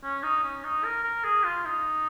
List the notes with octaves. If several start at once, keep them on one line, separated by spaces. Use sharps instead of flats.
C#4
D#4
C#4
D#4
A#4
A#4
G#4
F4
D#4